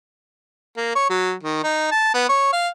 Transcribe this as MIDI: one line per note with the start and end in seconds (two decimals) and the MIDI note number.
0.77 0.94 58
0.95 1.08 73
1.10 1.33 54
1.43 1.59 51
1.64 1.88 63
1.91 2.12 81
2.14 2.26 59
2.29 2.49 73
2.53 2.68 77